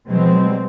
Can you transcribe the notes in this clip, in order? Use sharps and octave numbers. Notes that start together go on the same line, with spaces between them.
B2 F#3 G#3 C4
E3
F3
F#3
G3